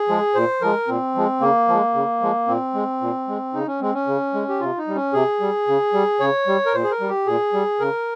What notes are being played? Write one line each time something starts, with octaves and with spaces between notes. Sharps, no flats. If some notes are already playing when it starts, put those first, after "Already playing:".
Already playing: G#4
F3 G#3
A#2 C5
F3 G#3 A#4
A#2 C4
F3 G#3
C#3 A#3
F3 G#3
C#3
F3 G#3
A#2 C4
G#3
A#2
G#3
C#3 D#4
C#4
G#3 C4
C#4
C#3
G#3
G4
C3 F4
D#4
G3
C#4
C3 G#4
G3
C#3
G3
C#3 C#5
G3
A#4
A#2 C5
G#4
A#4
G3
G4
A#2 G#4
G3
C#3 A#4